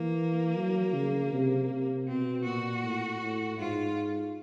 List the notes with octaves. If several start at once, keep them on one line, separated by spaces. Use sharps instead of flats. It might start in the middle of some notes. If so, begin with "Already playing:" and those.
Already playing: E3 A#3
F#3
C#3
C3
C3
B2 C4
A#2 F#4
A2
A2
G#2 F4